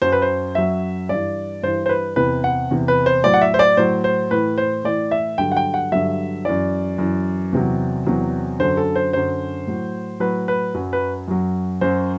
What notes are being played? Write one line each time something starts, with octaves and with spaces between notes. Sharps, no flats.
F#2 F#3 C5
B4
C5
F#2 F#3 E5
G2 E3 D5
G2 E3 C5
C5
B4
E2 C3 E3 B4
F#5
E2 C3 E3
B4
C5
A2 F#3 D5
F#5
E5
C5
D5
A2 F#3 C5
C5
A2 E3 B4
C5
A2 E3 D5
E5
G2 D3 F#3 G5
F#5
G5
F#5
G2 D3 F#3 E5
F#2 E3 D5
F#2 E3
E2 C3 F#3
E2 C3 F#3
F#2 D3 F#3 C5
A4
C5
F#2 D3 F#3 C5
A2 F#3
A2 F#3 B4
B4
F#2 F#3
B4
F#2 F#3
F#2 F#3 C5